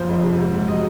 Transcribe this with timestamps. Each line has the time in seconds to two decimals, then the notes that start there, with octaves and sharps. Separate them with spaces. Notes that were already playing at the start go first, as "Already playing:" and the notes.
Already playing: F#1 F3 C5
0.08 F2 D#5
0.23 C3
0.38 G#2
0.53 G#2
0.68 F#3 D#5